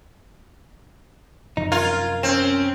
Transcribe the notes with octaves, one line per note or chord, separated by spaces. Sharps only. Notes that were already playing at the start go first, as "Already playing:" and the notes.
F#2 C3 F3 D#4
F4 A#4 G#6
C4 C#4 E7